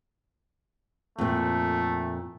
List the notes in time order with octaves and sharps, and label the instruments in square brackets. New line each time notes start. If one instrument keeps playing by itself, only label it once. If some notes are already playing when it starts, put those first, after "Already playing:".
[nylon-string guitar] F2 A#2 [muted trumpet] A3